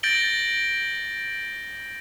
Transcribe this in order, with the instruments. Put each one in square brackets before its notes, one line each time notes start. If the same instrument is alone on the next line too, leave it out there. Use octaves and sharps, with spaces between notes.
[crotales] G6 A6 A#6 D7 F#7 G7